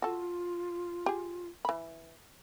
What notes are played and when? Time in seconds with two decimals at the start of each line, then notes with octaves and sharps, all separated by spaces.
0.02 F4 F#4 A4
1.06 G4 G#4
1.65 E3 B5